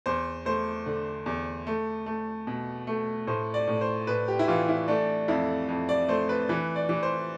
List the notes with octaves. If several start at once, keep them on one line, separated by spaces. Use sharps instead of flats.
E2 C5
A3 C5
D3
E2
A3
A3
B2
A3
A2 C5
D5
A2
C5
A2 B4
G4
E4
E3 F4
E4
A3 D4
F2 E4
F2
D5
A3 C5
B4
E3 B4
D5
E3
C5